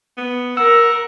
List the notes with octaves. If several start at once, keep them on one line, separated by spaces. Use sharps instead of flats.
B3
A#4 F#5 E6